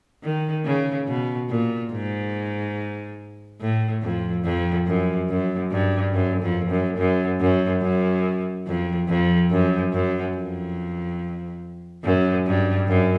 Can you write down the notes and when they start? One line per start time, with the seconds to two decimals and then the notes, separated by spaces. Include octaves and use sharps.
0.23 D#3
0.65 C#3
1.07 B2
1.49 A#2
1.91 G#2
3.61 A2
4.02 F2
4.44 F2
4.87 F#2
5.29 F#2
5.71 G2
6.13 F#2
6.42 F2
6.70 F#2
6.98 F#2
7.40 F#2
7.82 F#2
8.66 F2
9.08 F2
9.50 F#2
9.93 F#2
10.35 F2
12.04 F#2
12.46 G2
12.88 F#2